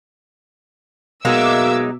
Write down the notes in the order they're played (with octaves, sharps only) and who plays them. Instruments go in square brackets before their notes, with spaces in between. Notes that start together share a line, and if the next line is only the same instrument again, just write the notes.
[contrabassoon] B2 [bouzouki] F#3 G#3 D#4 [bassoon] A#3 [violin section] E5 D6 E6